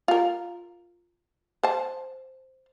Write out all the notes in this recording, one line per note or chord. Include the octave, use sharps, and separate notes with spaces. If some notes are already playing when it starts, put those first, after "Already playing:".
F4 A#4
C5 A5